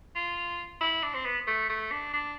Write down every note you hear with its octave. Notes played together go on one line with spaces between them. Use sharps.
F4
E4
D4
C4
B3
A3
A3
D4
D4